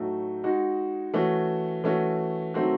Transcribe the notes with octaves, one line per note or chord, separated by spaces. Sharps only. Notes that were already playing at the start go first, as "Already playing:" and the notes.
Already playing: A2 F#3 A3 D#4 F#4
G#3 D#4 F#4
E3 A3 C#4 F#4
E3 A3 C#4 F#4
D#3 F#3 A3 C4 F#4